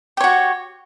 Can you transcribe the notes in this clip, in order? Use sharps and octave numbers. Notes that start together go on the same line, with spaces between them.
F#4 G4 C#5